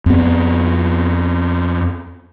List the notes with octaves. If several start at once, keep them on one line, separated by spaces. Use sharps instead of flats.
F2 B3